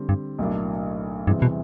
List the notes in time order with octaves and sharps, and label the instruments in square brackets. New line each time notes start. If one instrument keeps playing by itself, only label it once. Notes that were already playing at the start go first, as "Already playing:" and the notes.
Already playing: [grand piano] D3 G3 C4
[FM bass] G2
[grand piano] B1 A2 F#3 A#3 D4
[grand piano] E2 C3 E3 G3 C4 [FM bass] G2
[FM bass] B2